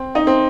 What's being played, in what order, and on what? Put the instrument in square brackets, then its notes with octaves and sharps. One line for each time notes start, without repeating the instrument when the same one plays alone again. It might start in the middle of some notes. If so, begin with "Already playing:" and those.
Already playing: [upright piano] C4
D#4
C4